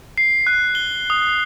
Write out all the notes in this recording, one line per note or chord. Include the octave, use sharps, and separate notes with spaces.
C7
F#6
G7
D#6